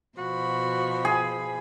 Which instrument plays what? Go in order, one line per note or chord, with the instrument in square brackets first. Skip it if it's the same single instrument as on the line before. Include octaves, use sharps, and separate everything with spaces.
[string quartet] B2 F3 B5 [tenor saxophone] F#4
[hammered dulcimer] G#4